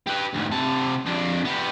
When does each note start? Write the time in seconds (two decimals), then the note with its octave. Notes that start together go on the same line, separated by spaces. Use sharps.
0.07 G4 B4
0.33 D2 G#2
0.51 C3 A5
1.06 F2 D4
1.45 B3 G4